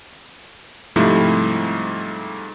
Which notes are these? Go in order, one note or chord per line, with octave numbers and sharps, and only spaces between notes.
G#2 C3 F3 G3 A3 E4